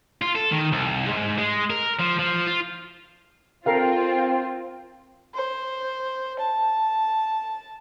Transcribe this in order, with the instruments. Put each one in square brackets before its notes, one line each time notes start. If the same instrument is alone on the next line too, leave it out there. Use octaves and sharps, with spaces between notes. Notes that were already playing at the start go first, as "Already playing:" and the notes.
[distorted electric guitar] F4
A4
D#3
C2
G#2
G#3
A#4
F3
F3
F4
[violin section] C4 F4 [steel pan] A4 A#4 F5 [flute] G5
[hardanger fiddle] C5
A5